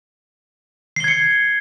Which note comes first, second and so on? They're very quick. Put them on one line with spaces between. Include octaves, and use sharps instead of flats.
C7 G7 G#6 C#7